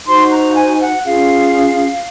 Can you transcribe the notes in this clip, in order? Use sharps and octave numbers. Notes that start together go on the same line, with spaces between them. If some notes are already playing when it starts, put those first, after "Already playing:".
D#4 F#4 C5 C6
A#5
F#5
G#5
F#5
C#4 F4 G#4 F5